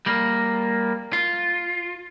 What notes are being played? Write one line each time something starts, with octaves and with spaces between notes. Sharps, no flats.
G3 A#3
F4